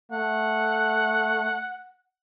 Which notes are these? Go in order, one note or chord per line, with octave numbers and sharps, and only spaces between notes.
A3 F#5